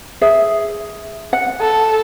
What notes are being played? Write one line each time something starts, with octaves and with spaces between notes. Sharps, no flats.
G#4 E5
F#5
A4